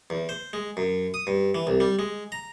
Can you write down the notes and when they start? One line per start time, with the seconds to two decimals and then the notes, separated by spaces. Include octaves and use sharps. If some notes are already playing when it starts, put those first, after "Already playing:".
0.10 E2
0.29 C5
0.53 G#3
0.77 F#2
1.14 D#6
1.27 G2
1.55 E3
1.67 C2
1.80 G3
1.99 G#3
2.32 A#5